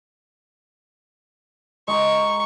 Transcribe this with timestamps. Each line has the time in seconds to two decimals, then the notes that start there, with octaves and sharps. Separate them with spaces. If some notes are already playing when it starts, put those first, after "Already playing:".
1.88 G#3 A#5 C#6